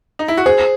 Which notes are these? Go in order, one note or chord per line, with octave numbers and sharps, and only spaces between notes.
D#4
E4
F#4
G#4 C5